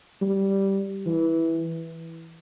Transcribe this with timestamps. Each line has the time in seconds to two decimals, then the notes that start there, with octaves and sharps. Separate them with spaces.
0.22 G3
1.06 E3